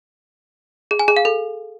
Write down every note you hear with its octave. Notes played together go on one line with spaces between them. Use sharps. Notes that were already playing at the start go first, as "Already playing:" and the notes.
G#4
G#5
G#4
F5
A4